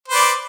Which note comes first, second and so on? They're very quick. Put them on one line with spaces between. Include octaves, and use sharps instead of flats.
C5 B4 D5